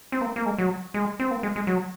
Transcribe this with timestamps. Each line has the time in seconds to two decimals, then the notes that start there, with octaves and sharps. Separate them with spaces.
0.12 C4
0.21 A#3
0.36 A#3
0.46 G#3
0.58 F#3
0.94 G#3
1.20 C4
1.31 A#3
1.43 G#3
1.56 G#3
1.67 F#3